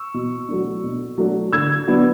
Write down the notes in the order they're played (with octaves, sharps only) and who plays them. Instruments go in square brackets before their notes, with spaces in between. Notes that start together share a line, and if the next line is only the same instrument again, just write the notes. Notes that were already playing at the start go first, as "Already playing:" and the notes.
Already playing: [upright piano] C#6 E6
B2
F#3 A3 D4
B2
F#3 A3 D4
D3 E6 G#6
F#3 B3 D4